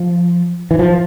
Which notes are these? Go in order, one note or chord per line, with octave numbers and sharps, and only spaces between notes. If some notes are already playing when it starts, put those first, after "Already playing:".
Already playing: F3
E3
F3